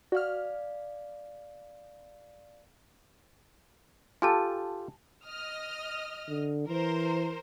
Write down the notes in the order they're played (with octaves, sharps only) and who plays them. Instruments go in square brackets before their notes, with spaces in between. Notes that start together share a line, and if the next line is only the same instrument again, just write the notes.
[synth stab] F#4 F6 [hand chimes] D5 F5
[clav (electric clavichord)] F4 G4 A4 [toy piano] G#5 A5
[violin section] D#5 D#6 F6
[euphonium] D3
[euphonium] E3 [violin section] A#4 C5